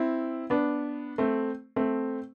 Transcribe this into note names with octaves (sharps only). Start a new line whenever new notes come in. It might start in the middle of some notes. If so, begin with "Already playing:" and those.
Already playing: C4 E4
B3 D4
A3 C4
A3 C4